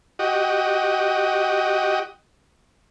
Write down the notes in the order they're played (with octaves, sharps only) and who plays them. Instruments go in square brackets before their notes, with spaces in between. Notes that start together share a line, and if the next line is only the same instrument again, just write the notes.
[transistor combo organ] F#4 G4 D#5